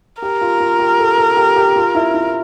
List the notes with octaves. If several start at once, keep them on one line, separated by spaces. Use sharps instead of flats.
G4 A#4
F4
F4
G4
A4
A4
G4
G4
F4
E4
E4